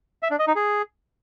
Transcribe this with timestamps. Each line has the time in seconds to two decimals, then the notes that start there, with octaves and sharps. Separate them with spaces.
0.23 E5
0.31 D4
0.39 D#5
0.48 D#4
0.56 G#4